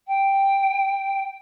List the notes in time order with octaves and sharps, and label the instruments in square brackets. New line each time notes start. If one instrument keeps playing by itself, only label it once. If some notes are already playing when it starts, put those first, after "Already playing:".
[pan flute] G5